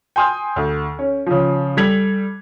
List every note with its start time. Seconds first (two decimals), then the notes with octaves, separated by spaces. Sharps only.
0.16 G5 G#5 C6 D#6 F6 G6
0.56 D2
0.99 C#4
1.26 C#3 F3
1.77 G3 A4 G#6 B6 F7 F#7